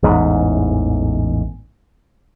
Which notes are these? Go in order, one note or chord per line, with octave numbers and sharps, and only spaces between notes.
A1 E2 G#2